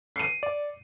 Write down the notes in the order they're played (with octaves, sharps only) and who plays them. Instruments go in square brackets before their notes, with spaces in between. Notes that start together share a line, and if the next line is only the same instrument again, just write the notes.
[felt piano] C7 C#7 D#7
[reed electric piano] D5